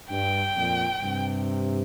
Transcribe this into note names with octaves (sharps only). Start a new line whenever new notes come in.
G2 G5
F2 A#2
G2 C3